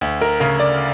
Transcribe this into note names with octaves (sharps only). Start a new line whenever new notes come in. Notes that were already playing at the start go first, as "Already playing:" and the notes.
D2
A#4
C#3 A#4
D5